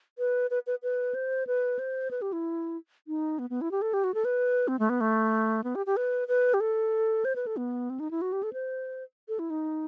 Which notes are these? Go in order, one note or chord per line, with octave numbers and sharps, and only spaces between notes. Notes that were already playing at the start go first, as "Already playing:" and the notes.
B4
B4
B4
B4
C5
B4
C5
B4
G4
E4
D#4
B3
B3
E4
G4
A4
G4
F#4
A4
B4
C4
A3
B3
A3
B3
G4
G4
B4
B4
G4
A4
C5
B4
A4
B3
C4
D#4
E4
F#4
G4
A4
C5
A4
E4
D#4